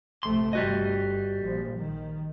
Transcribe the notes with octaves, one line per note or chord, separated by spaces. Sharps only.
A#1 C3 A3 C6
G1 G3 F#4 D#5
A#1 F3
D#3